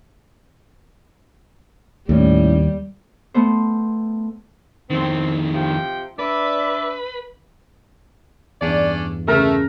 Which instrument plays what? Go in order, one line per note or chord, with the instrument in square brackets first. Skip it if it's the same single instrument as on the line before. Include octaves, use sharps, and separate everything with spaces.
[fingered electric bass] D#2 [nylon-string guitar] A2 C#4 [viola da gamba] G3
[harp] A3 B3 C5
[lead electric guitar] F2 D#3 [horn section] C4
[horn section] C3 F3 G5
[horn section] D4 D5 E5 [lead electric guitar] B4
[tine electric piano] E2 G2 [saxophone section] C#4 D4 D5
[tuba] C#3 [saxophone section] A3 [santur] A#4